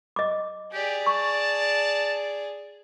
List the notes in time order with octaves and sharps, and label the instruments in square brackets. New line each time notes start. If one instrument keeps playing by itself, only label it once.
[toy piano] D#5 D6
[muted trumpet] G4 [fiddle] G#4 D5
[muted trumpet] A5 [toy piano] C#6